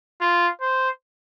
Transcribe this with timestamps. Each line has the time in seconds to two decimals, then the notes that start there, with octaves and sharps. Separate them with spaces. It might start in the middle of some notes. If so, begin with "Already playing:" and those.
0.21 F4
0.61 C5